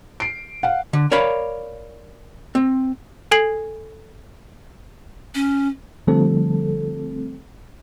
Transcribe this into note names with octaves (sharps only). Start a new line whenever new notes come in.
C7 D7
F5 F#5
D3
A#4 C#5 D5 F5 B5
C4
A4 G#5 G#6 C7 F#7
C#4
D3 F3 G3 A3 C4 A4